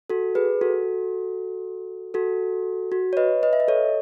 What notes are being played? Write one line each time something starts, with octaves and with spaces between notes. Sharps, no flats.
F#4 A4
G#4 B4
F#4 A4
F#4 A4
F#4
C#5
B4 D#5
B4 D#5
E5
D#5
A4 C#5